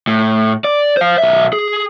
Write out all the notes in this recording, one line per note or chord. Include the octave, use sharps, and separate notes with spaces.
A2
D5
C5 F5
B1 E5
G#4